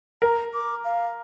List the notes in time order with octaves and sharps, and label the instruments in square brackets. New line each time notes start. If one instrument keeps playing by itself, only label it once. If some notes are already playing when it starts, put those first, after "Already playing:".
[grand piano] A#4 [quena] A#5
[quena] D6
F5